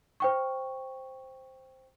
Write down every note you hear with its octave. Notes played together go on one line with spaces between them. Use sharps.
C5 G5 C#6